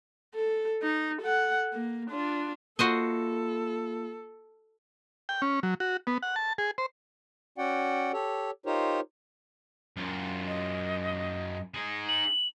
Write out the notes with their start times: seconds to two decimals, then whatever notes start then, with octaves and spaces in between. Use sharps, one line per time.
0.35 A4
0.82 D#4
1.22 A4 F#5
1.73 A#3
2.11 D4 F4
2.79 A#3 F4 F#4 A4 C5 D#5
5.29 G5
5.42 C#4
5.63 F#3
5.80 F#4
6.07 B3
6.23 F#5
6.36 A5
6.58 G#4
6.78 C5
7.58 C#4 F#4 D5 F#5 G5
8.13 G4 A4 C#5
8.66 D#4 F4 G4 A#4 C5 C#5
9.97 F#2 F4
10.47 D#5
11.74 D#4 G#4
12.08 F#7